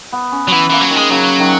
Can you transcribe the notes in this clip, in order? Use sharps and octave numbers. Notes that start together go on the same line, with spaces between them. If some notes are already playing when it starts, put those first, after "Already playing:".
B3
C#4
F#3
E3 B3
E3 A#3
F#3
D#3
G#3
C#3 F#3
D#3